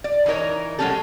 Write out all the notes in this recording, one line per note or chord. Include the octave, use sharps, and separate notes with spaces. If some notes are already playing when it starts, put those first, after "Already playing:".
D5
E3 D#4 A#4 C#5
F#3 G#3 A3 C#4 G4 A4